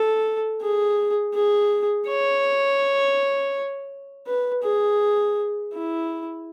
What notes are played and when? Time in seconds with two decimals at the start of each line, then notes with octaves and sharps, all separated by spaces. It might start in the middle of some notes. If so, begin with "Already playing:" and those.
Already playing: A4
0.62 G#4
1.34 G#4
2.07 C#5
4.27 B4
4.63 G#4
5.73 E4